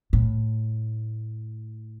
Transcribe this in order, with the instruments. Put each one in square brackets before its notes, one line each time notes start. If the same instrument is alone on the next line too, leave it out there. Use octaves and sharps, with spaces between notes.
[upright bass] A2